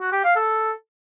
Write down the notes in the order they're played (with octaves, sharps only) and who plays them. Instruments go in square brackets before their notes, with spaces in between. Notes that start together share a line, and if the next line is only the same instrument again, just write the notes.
[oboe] F#4
G4
F5
A4